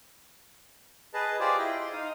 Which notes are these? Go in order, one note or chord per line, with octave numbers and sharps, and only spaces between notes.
G#4 B4 D#5 A5
F4 G4 G#4 C5 D5
E4 D#5 G5
C6
D#4 F5 D#6